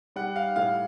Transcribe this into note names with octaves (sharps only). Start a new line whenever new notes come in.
G3 F#5
F5
A2 F5